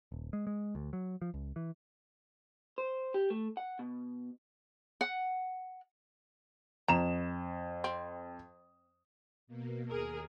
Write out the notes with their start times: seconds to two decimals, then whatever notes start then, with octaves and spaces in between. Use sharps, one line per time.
0.12 D#1
0.33 G#3
0.47 G#3
0.75 D2
0.93 F#3
1.22 F3
1.34 C#2
1.56 E3
2.78 C5
3.14 G4
3.30 A3
3.57 F#5
3.79 B2
5.01 F#5
6.88 F2 A#5 E7
7.84 C4
9.47 B2 A#3
9.88 D#2 G#4 A#4